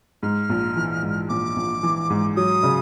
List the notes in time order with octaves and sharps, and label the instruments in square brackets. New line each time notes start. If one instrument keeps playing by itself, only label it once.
[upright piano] G#2 [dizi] F6
[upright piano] A#1
E3
G#2
[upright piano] A#1 [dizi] D6
[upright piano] A#1
E3
G#2
[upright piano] F#3 [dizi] D#6
[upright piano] C#3